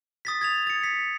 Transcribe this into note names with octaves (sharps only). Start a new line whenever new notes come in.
D#6 A6 B6
G#6 A6 F7
A6 C#7
B6